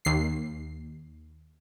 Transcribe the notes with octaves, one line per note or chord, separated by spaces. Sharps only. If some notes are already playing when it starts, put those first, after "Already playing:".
D#2 C7